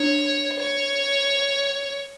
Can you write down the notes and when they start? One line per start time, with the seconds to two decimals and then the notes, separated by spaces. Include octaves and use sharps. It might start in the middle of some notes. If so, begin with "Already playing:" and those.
Already playing: D4 C#5
0.59 C#5